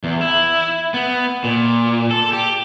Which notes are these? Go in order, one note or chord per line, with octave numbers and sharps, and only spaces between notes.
E2
E4
B3
A#2
A4
G4